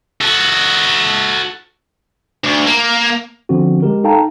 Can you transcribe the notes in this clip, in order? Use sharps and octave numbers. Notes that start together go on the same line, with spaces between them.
F#4 A4
D2
A#3
D3 F3 C4 C#4 F#4
G#3 G4 A#4
D#4 A4 F5 G5 A5 A#5